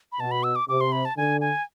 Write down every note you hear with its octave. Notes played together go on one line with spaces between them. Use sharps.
B5
B2 A5
B5
E6
D6
C3 D6
C6
B5
A5
D3 G#5
G#5